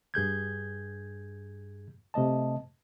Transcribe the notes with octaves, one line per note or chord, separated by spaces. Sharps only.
G2 G#4 G6 G#6
C3 A3 D#5 A5